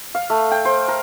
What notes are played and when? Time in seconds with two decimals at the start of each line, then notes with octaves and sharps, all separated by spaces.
0.15 F5
0.30 A3
0.51 G5
0.65 C5
0.88 A#4